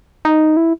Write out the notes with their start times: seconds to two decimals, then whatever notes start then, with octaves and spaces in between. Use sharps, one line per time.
0.25 D#4
0.57 E4